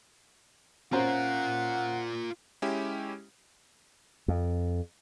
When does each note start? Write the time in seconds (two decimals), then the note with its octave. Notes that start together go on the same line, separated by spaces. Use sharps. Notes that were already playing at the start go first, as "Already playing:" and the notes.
0.92 C#4 F4 A#4 C5 F#5 A#5
2.62 G#3 C#4 E4 G4
4.28 F2